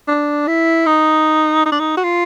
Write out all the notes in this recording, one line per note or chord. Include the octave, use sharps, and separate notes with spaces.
D4
E4
D#4
D#4
D4
D#4
F#4
F4